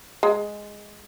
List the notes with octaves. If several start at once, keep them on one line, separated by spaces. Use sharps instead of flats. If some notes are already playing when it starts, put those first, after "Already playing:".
G#3